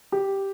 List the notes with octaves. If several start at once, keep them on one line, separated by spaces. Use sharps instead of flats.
G4